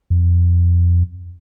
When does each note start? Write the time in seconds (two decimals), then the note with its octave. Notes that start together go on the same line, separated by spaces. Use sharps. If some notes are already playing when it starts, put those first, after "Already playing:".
0.10 F2